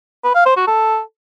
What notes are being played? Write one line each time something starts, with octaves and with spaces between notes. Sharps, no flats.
B4
F5
C5
F#4
A4